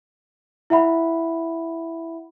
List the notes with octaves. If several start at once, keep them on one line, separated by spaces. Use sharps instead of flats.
E4 E5 F#5 B5